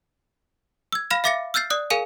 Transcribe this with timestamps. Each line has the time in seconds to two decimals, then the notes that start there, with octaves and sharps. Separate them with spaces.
0.92 E6 G#6
1.10 F5 B5 F6 A#6 E7
1.24 E5 F5 D6 A6 A#6 C#7
1.54 E6 F6 G6 A6 C7
1.70 D5 D#6 F#6
1.90 G#4 A#4 F5 G#5 C#7 D#7